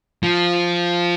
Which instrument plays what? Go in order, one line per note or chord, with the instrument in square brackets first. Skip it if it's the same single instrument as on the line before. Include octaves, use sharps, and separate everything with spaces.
[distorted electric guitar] F3